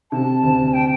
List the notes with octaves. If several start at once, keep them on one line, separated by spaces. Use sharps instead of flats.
C3 A5
D2
G5